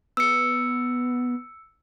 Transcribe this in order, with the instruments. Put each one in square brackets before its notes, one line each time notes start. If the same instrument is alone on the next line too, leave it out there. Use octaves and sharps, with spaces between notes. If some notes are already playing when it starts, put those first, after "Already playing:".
[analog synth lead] B3 [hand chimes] E6 C#7